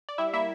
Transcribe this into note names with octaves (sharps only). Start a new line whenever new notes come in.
D5
G3 E4 E5
A#3 E4 E5